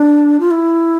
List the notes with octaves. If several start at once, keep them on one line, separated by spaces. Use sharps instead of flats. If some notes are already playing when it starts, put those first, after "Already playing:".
Already playing: D4
F4
E4